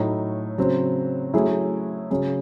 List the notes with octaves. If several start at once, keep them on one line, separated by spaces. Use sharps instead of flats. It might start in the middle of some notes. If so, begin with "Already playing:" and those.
Already playing: A2 F#3 A3 D#4
C#3 F#3 C4
F#3 A3 C#4 E4 G#4
C#3 F#3 C#4 G#4